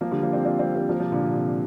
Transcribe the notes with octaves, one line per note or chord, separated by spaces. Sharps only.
F3 A#3
D3 G3
F3 A#3
G3 C4
C4 F4
G3 C4
G3 C4
F3 A#3
C3 F3
A#2 D3
C3
C3